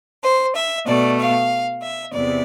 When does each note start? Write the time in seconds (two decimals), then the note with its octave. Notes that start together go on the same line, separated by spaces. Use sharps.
0.23 C5
0.55 E5
0.86 B2 A3 D5
1.18 F5
1.81 E5
2.12 E2 C3 D5